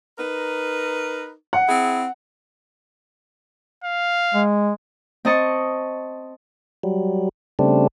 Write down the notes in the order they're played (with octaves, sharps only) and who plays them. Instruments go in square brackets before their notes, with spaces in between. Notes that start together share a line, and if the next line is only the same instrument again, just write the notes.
[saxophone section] D#4 A#4 B4
[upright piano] F#5
[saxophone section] C4 E4 G#4
[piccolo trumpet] F5
[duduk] G#3
[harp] C4 D#5 A5 C#6
[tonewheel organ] F#3 G3
C#3 G3 A3 C4 D4